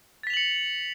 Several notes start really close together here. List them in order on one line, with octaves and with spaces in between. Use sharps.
A6 B6 F7 F#7 C#7